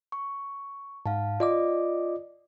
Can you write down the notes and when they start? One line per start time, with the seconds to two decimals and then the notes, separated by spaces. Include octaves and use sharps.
0.12 C#6
1.06 G#2 F5 A5
1.40 F4 D5 D#5 D6